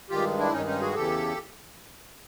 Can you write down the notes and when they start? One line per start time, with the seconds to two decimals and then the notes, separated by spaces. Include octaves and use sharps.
0.10 G2 D#3 G#3 F4 G4
0.38 D4 E4
0.52 G2 D#3 G#3 C#4 D#4
0.66 C#4 D#4
0.80 F#4 G#4
0.94 E2 C#3 E3 G4 A4